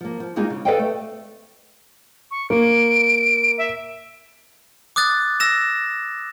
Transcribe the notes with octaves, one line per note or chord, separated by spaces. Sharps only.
F3 A#3
F3
G3 G#3 A#3 D#4 F4 G#4
C#3
A4 B4 D5 D#5 F5 G5
A3
C#6
A#3 D7
E5
D6 D#6 F#6 A6
E6 A#6 E7